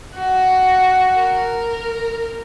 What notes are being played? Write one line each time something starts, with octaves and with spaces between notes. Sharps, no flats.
F#4
A#4